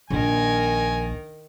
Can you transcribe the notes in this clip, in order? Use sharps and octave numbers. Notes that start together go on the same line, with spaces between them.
A#1 D#3 A#4 G#5